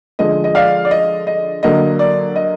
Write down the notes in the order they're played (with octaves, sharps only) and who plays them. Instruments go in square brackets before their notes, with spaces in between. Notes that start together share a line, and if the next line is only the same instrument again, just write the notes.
[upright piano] D3 F3 G#3 D#5
D#5
D5 F5
D5
D#5
D#5
D3 F#3 A#3 D#5
D5
D#5